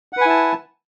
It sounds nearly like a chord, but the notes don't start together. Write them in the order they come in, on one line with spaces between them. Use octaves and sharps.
F#5 B4 G#5 E4 A5